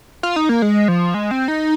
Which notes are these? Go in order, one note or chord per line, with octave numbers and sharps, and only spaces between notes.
F4
D#4
A#3
G#3
F3
G#3
C4
D#4